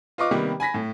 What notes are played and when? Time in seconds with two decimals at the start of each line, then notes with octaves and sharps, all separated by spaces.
0.18 F4 B4 D#5 F5 C#6 D6
0.31 C3 D#3 G3 A#3 B3
0.60 G#5 B5 A#6 B6
0.74 A2